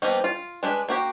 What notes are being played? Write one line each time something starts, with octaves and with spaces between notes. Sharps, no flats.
F3 G3 A#3 B3 D#4
F4
G#3 D4 B4
A#3 F#4 G4